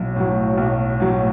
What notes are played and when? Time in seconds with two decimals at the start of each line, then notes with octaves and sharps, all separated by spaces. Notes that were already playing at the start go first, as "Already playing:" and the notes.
Already playing: B1 A2 F#3
0.16 A2 F#3
0.58 B1
1.00 A2 F#3